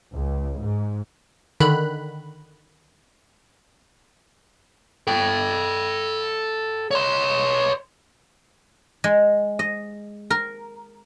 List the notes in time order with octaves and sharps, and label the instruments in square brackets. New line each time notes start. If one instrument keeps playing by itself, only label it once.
[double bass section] C#2
G#2
[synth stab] D3 D#3 B5 F#6
[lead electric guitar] A4 G5
C#5 C6
[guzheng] G#3
D#5
A#4